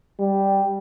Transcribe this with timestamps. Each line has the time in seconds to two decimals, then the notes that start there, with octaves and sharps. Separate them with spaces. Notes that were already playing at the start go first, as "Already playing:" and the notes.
0.19 G3